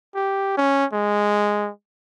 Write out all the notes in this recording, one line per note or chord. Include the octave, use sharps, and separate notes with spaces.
G4
C#4
G#3